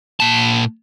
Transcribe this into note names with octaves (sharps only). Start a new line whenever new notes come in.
A#2 A5